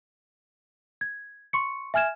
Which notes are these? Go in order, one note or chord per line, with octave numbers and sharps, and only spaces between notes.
G#6
C6 C#6 C#7
E5 G#5 F6 G#6 E7